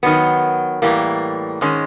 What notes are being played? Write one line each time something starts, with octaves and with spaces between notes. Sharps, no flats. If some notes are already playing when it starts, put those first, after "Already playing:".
D#3 F#3 B3
A2 E3 G3 A#3
G#2 D#3 G#3 C#4